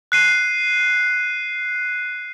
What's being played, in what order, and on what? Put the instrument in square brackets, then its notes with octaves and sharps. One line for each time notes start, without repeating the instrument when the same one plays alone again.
[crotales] F#6 C7 D#7